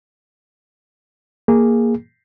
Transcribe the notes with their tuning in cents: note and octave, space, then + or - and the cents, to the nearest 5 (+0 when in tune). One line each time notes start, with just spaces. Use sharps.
A#3 +0 G#4 -15